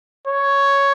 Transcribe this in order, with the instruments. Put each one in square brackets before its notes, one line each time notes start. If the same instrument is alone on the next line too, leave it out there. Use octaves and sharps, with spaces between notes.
[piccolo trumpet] C#5